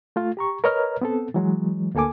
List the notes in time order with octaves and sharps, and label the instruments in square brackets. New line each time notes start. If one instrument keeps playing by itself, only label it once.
[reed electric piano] A3 F4
G4 A#5 C#6
A#4 B4 C#5 D#5 A#5 F6
B3 C4 A4
E3 F#3 G#3
D2 A#3 A4 G#5 D6